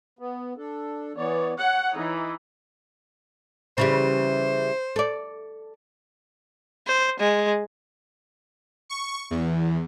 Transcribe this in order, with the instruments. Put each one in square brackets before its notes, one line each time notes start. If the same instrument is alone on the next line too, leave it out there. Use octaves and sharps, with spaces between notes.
[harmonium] B3
D4 A4
[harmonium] E3 B3 D5 [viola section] C#5
[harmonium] C#5 [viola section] F#5
[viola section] E3 D#4
[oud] C#3 E3 G3 [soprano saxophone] C5
[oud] A4 D5
[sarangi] C5
G#3
[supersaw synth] C#6
E2